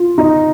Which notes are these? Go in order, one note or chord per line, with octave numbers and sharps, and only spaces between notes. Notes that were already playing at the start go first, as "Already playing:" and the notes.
Already playing: F4
D#4